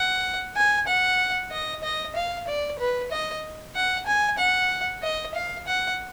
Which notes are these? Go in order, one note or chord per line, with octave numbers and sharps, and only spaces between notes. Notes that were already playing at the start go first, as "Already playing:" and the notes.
Already playing: F#5
G#5
F#5
D#5
D#5
F5
D5
B4
D#5
F#5
G#5
F#5
D#5
F5
F#5